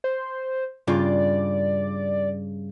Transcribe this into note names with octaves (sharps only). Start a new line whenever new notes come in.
C5
G2 C#3 F4 D5